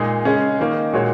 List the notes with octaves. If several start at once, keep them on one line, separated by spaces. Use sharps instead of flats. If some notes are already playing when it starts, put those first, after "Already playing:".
Already playing: A#2 G#3 D#4 G#4
C#3 G#3 C#4 G#4
D#3 A#3 D#4
A#2 G#3 F#4 C#5